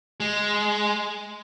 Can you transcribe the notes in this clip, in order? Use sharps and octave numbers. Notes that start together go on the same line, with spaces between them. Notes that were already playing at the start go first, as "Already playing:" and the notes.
G#3